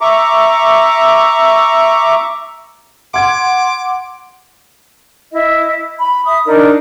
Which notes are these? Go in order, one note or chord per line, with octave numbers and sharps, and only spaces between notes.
E5 A#5 C#6 D6
F#5 C6 D6 G#6 D7
E4 D#5
B5
E5 D#6
D4 D#4 A#4 D5